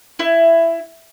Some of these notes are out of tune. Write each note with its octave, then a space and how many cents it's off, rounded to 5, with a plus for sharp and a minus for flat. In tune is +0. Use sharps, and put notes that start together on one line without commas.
E4 +15